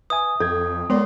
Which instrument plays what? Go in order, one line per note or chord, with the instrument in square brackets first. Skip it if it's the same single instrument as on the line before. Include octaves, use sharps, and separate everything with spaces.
[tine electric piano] B4 E5 G#5 [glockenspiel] D#6
[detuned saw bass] F2 [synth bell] A4 [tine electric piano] G6 G#6
[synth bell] G#3 C#5 [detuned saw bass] B3 [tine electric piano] A#4 D5 C6